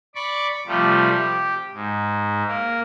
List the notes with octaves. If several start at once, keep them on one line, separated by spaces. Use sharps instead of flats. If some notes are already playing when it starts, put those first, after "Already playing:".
D5 B5 C#6 D6
C3 F3 G3 A3
G4
G#2
A#3